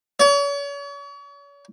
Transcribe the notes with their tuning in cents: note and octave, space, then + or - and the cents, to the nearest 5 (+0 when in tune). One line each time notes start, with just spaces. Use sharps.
C#5 +40